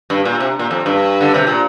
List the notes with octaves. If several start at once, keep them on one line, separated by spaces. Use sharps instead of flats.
G2
A#2
C3
A#2
F2
G2
D3
C3
A#2